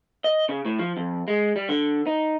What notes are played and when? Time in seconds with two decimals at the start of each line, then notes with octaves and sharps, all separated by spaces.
0.24 D#5
0.49 C#3
0.65 A2
0.79 F3
0.97 F2
1.28 G#3
1.56 G3
1.69 D3
2.07 D#4